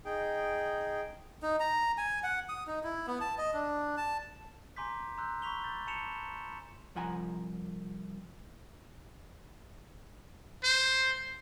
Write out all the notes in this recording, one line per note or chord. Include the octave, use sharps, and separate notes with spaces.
D#4 G#4 G5
D#4
A#5
G#5
F#5
D#6
D#4
E4
B3
A5
D#5
D4
A5
G#5 A#5 C6 D6 G6 B6
A#5 C6 E6 F#6 G6
B5 C#6 B6 F7 G7
G6 A6
A5 B5 C#7 E7 F7
C2 F3 F#5 G#5 A#5
C5